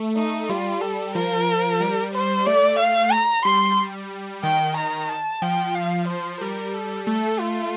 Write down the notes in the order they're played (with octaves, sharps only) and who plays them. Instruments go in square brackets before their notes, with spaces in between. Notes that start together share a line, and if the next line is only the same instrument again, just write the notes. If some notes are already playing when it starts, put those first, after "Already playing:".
Already playing: [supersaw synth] A3
[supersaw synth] A3 [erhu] D#4
[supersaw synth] G3 [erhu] F4
[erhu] A4
[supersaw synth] F3 [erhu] A#4
[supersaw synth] G3
[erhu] C5
[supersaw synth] A3 [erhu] D5
[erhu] F5
A#5
[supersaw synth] G3 [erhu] C6
[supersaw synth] D#3 [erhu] G5
[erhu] A#5
A5
[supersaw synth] F3 [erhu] G5
[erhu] F5
C5
[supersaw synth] G3 [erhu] A#4
[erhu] A4
[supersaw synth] A3 [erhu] A4
[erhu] F4